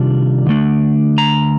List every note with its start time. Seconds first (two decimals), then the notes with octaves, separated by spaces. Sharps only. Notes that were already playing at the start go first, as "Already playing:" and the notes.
Already playing: C3 D#3 G3 D4 F4
0.47 D3 A3 D4
1.18 A#5